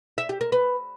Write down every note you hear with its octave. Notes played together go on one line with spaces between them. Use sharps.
E5
G4
A#4
B4